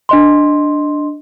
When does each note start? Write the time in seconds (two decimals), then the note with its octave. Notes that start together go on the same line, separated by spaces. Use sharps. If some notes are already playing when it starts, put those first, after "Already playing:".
0.09 D4 D#5 C6